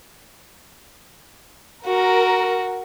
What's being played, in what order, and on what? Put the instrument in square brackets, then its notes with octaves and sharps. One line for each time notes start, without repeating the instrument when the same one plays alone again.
[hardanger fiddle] F#4 [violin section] A#4